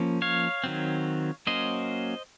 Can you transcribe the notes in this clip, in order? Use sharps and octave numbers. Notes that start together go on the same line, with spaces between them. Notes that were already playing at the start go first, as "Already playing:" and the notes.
Already playing: F3 A#3 C#4
C#5 F5
D#3 F#3 C4
F#3 A#3 C#4 C5 D#5